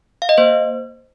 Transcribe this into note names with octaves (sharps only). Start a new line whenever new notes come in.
F5
D#5
A#3 C5